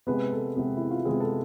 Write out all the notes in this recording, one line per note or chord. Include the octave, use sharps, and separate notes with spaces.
C3 G#3 B3 B4
A4
C3 G#3 B3
E4
F4
C3 G#3 B3 G#4
A4